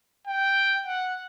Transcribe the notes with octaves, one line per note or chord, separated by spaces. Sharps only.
G5
F#5